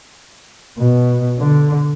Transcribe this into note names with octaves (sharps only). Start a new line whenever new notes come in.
B2
D3